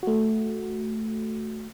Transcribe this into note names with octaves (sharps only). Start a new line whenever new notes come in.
A3 F#4